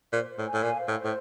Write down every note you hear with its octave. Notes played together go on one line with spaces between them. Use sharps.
A#2 C5
C5
A2
G#5
A2
A#2 F5
C5
A2
C5
A2